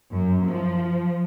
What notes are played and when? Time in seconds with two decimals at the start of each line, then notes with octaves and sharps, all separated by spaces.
0.12 F#2
0.46 F3